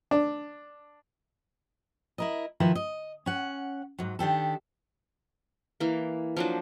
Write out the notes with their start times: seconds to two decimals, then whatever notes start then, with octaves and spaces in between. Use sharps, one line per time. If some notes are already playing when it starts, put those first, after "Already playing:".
0.11 D4
2.18 E4 A#4 D#5
2.60 D#3 F3 E4 A#4 B4
2.75 D#5
3.26 C#4 F#5
3.99 G#2 F#3
4.19 D#3 D4 G4 A4
5.80 E3 A#3
6.37 F3 F#3 D4